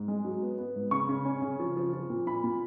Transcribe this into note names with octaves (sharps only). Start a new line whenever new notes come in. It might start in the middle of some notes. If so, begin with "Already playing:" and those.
Already playing: G#2
G#3
F#3
B3
B3
G#2
C#3 C#6
C#3
C#4
C#3
F3
F3
F3
A#2
A#2 B5
A#2